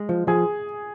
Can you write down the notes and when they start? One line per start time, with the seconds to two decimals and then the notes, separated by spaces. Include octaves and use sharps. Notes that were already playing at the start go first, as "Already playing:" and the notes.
Already playing: G#3
0.09 F3
0.27 F3 G#4